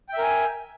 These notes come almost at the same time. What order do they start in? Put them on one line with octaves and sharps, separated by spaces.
G5 E5 A#4 G#5